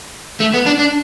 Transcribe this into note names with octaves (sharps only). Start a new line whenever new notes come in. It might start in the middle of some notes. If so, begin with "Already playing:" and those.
A3
B3
D4
D4